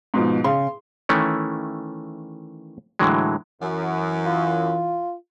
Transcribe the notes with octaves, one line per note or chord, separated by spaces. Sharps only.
G#2 B2 F3
C#3 C6
D#3 E3 A3 C#4
A2 D3 E3 F#3 G#3
F#2 E3
F4